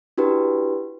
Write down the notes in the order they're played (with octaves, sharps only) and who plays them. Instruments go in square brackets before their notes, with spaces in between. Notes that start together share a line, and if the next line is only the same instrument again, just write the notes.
[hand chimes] D4 E4 F#4 G4 B4